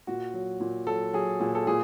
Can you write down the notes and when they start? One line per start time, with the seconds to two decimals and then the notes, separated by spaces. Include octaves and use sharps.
0.07 A#2 F#4
0.34 F#3
0.60 A#2
0.87 F#3 A4
1.13 F#3 G#4
1.40 A#2 G#4
1.55 A4
1.67 A#2 G#4